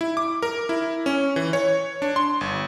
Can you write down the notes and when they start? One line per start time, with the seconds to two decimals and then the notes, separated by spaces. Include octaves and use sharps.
0.01 E4
0.17 D6
0.42 A#4
0.69 E4
1.06 C#4
1.36 E3
1.53 C#5
2.02 D4
2.16 C6
2.41 G1